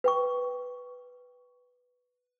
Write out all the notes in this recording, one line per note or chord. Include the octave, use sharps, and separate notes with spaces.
B4 G5 C#6